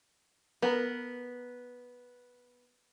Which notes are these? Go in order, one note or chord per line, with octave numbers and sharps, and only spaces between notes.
B3 A#4